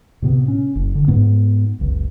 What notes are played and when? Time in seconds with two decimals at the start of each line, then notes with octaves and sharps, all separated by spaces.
0.22 A2 C3 B3
0.48 C#4
0.75 F#1
0.95 D3
1.08 G#2 B3
1.80 F#1 C#2